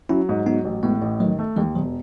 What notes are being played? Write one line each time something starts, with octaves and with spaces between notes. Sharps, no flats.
F#3 C#4 E4
G#2
F#3 B3 D#4
A1
A2 G#3 B3
A1
D#3 F#3 A3
A3
D#2 E3 G#3
E1 D#3 F#3